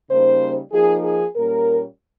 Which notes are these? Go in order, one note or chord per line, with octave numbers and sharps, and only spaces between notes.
C#3 G3 A#3 D#4 C5
F3 A#3 D#4 G#4
G#4
A#2 G3 A#3 C#4 A#4